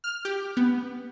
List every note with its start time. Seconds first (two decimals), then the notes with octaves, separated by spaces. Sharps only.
0.04 F6
0.25 G4
0.57 B3